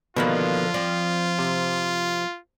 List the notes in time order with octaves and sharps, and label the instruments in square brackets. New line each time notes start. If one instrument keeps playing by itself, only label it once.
[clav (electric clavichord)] B2 D#3 A#3 [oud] D3 F3 B4 [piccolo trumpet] F4
[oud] F3 C4 [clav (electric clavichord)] D5
[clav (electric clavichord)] C3